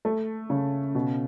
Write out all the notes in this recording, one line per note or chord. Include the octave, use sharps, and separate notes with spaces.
A3
C#3
B2